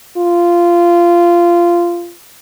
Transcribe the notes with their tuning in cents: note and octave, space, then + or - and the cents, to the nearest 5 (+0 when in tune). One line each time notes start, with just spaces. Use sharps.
F4 -15